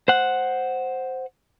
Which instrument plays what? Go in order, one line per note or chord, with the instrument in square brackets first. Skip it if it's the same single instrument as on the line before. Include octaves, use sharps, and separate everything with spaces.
[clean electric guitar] C5 F#5